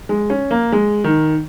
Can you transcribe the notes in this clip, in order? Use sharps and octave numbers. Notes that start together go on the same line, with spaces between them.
G#3
C#4
A#3
G#3
D#3